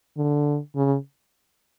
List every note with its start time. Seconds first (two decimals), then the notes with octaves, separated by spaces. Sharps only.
0.17 D3
0.76 C#3